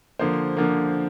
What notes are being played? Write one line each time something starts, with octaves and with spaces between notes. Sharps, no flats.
D3 F3 A#3 C5
D3 F3 A#3